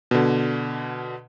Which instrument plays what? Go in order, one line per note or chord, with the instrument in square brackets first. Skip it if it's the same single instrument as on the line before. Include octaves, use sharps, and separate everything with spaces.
[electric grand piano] B2 D3